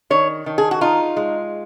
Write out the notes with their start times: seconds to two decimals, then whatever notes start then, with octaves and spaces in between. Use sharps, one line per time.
0.10 D#3 C#5
0.46 D#3
0.58 G#4
0.71 F#4
0.81 D#4 F4
1.17 G#3